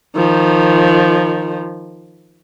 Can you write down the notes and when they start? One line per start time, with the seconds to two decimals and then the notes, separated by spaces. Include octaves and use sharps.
0.16 D#3 F3